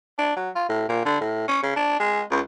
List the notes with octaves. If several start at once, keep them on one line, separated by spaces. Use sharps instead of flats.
D4
F#3
F4
A2
A#2
D3
A2
C#4
C#3
D4
G#3
C#2